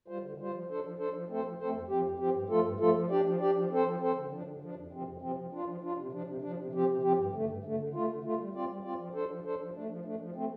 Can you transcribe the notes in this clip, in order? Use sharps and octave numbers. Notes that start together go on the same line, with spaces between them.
G3 F4 C5
D3
G3 F4 C5
F3
D4 A4 C5
F3
D4 A4 C5
F3
A3 C4 A4 C5
F3
A3 C4 A4 C5
F2
F3 C4 G4
F2
F3 C4 G4
G2
F3 A3 F4 A4
G2
F3 A3 F4 A4
F3
D4 G4 D5
F3
D4 G4 D5
F3
C4 A4 C5
F3
C4 A4 C5
D3
F3 D4
D3
F3 D4
F2
C3 F3 C4
F2
C3 F3 C4
F3
D4 F4
F3
D4 F4
C3
F3 D4
C3
F3 D4
C3
F3 C4 G4
C3
F3 C4 G4
G2
D3 A3
G2
D3 A3
D3
A3 F4
D3
A3 F4
G3
C4 F4 D5
G3
C4 F4 D5
F3
D4 A4 C5
F3
D4 A4 C5
F3
A3 D4
F3
A3 D4
F3
A3 C4